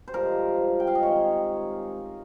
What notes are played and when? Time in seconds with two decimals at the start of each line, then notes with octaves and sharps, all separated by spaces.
0.08 C5
0.13 G2 F3 G#3 A#4
0.80 G5
0.87 F5
0.95 D#5
1.03 C3 D#3 G#3 C#5